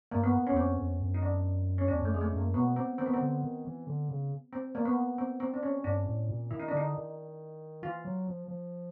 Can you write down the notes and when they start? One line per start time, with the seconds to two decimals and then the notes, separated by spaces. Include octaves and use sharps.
0.11 G2 A#3
0.24 B3
0.47 E2 C#4
0.56 F2 C4
0.79 F2
1.00 F#2
1.14 D#4
1.22 D4
1.78 C#4
1.88 E2 D4
2.00 F#2
2.05 A3
2.10 F2 G#3
2.21 A3
2.32 F#2
2.38 A#3
2.54 B2 B3
2.76 C4
2.98 D#3 C4
3.06 B3
3.14 C4
3.20 D3
3.42 D#3
3.65 E3
3.87 D3
4.09 C#3
4.53 C4
4.75 A#3
4.85 B3
5.18 C4
5.40 C4
5.54 D4
5.63 C#4
5.84 G2 D4
6.06 A2
6.29 A#2
6.51 D#3 E4
6.60 D#4
6.68 D4
6.73 D3 D#4
6.95 D#3
7.82 E3 F4
8.05 F#3
8.27 F3
8.48 F3